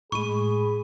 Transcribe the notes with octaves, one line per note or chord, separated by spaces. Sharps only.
A2 G#3 G#4 B5 C#6 D#7